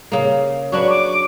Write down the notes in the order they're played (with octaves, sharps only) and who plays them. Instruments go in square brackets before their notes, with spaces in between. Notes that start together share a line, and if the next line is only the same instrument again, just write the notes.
[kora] C#3 A#3
[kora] F#3 D4 B4 [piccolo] C#6
[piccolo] D6